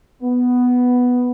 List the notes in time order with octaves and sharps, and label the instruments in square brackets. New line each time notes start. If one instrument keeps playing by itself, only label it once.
[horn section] B3